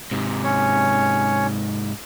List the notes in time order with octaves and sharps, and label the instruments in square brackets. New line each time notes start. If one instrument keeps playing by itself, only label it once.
[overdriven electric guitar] G#2 C3
[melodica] C#4 C#5